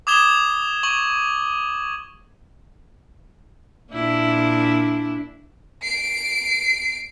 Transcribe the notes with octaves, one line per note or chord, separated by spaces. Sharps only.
D6 D#6 G#6 E7 G7
C#6 F#7
A#2 D4 E4
C7 D7